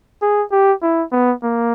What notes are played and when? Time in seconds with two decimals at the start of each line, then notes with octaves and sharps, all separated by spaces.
0.22 G#4
0.52 G4
0.82 E4
1.12 B3
1.43 A#3